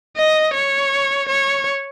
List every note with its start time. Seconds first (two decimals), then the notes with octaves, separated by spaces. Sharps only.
0.17 D#5
0.54 C#5
1.29 C#5